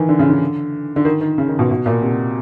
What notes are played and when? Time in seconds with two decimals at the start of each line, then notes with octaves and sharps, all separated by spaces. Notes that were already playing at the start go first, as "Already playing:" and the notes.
Already playing: D#3 E3
0.09 D3
0.19 C#3
0.30 D3
0.96 D3
1.05 D#3
1.21 D#3
1.38 C#3
1.49 D#3
1.59 B2
1.71 B2
1.86 A#2
2.02 C3